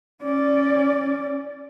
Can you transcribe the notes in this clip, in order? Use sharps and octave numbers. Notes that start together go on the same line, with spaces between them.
C#4 D5